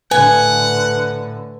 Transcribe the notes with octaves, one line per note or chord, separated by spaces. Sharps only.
A2 D3 B4 F#5 G#5